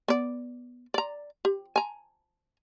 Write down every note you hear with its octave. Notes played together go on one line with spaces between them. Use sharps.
B3 D5
D5 A#5
G4
G#5 A#5